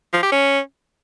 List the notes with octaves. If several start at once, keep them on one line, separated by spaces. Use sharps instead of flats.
F3
G4
C#4